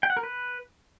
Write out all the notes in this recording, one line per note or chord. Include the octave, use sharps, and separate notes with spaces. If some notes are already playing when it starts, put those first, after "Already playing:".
G5
F#5
A#4
B4